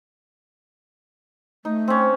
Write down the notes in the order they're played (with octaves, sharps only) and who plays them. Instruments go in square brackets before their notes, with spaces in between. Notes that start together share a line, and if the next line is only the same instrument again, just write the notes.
[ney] A3 [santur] D#4
[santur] C4 C#4